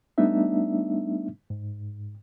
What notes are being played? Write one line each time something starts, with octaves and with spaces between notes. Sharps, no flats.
G3 A3 B3 D4 D#4 E5
G#2